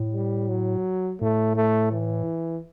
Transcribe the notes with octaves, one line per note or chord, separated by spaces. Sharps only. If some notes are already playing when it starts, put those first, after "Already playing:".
Already playing: A2
G3
F#3
A2 A3
A3
E3